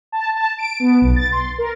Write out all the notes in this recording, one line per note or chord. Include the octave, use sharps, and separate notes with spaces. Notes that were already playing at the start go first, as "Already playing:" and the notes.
A5
A5
D7
B3
B1
A6
C6
A#4